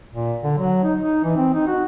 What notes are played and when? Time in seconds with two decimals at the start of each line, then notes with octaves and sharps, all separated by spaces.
0.12 A#2
0.43 D3
0.58 F#3
0.84 D#4
0.99 D#4
1.24 E3
1.37 C4
1.54 D#4
1.67 F#4